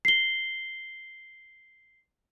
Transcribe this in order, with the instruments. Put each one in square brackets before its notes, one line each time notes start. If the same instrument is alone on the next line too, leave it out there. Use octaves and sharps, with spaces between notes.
[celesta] C7 G7